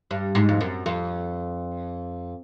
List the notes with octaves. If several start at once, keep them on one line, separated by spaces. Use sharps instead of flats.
G2
G#2
F2
F#2
F2